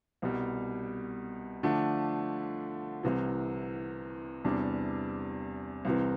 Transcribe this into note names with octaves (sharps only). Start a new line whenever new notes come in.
C2 B2 G3
D3 F3 A3 D4
C2 C3 E3
E2 C3 G3 D4
C2 C3 E3